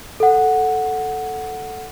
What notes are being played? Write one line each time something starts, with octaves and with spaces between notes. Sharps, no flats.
A4 F#5